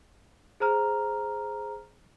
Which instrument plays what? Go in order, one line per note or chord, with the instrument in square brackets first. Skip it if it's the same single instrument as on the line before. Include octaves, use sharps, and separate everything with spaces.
[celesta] G#4 C5 A#5 F6